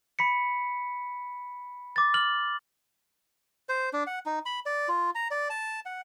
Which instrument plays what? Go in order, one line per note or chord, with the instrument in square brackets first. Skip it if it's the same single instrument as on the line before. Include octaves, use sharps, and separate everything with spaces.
[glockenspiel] B5 B6 C#7
D6 A6
F6 F#7
[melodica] C5
D4
F#5
D#4
B5
D5
F4
A#5
D5
A5
F#5